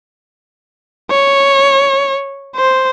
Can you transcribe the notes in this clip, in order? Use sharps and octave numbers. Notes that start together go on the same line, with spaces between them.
C#5
C5